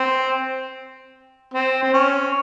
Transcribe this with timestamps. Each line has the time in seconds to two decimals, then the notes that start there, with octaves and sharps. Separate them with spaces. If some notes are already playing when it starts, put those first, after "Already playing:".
Already playing: C4
1.54 C4
1.83 C4
1.94 C#4